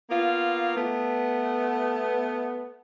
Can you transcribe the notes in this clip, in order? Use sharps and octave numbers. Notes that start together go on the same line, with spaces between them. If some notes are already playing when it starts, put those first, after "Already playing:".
A#3 B3 F4
A3 B3